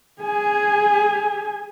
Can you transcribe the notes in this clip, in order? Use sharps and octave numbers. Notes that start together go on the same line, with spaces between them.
G#4 G#5